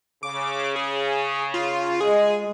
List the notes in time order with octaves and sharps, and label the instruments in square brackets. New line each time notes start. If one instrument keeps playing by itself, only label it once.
[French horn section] C#3 [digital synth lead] D6
[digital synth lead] G#4
F4
[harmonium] G#3 [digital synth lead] G#4